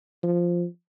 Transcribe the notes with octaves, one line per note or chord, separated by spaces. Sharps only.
F3